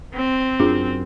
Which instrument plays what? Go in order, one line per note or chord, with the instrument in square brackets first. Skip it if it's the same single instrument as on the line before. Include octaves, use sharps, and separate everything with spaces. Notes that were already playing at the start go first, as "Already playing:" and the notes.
[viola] C4
[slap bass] F#2 [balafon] D4 F4 G#4